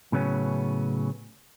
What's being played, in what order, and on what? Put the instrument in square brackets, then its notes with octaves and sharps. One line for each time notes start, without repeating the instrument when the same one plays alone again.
[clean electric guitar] A2 C#3 F#3 B3 C#4